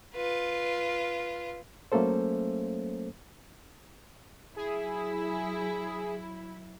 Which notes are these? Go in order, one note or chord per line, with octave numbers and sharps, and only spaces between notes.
F4 B4
F#3 A3 A#3 C#4 A4 C5
F#3 E4 G#4